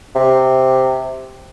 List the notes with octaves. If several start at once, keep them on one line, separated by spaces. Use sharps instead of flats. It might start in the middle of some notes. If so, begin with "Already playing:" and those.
C3